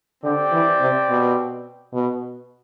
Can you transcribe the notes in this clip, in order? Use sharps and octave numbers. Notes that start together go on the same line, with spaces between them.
D3 C4 G4 D5 G5
E3
C3
B2
B2